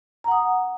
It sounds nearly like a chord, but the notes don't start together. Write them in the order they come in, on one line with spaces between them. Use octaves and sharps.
A#5 F#5 D#6